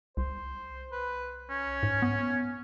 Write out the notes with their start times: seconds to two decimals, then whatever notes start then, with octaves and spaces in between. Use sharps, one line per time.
0.17 C2 C5
0.92 B4
1.50 C#4
1.83 G#2
2.02 B3